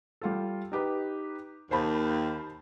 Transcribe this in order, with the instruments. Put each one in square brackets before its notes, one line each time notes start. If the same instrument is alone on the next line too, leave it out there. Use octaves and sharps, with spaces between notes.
[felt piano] G3 F4 A4
D#4 G4 B4
[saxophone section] D#2 [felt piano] C5 A5 B5